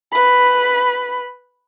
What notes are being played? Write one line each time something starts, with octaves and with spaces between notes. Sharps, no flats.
B4 B5